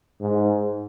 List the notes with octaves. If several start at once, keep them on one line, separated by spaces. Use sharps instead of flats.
G#2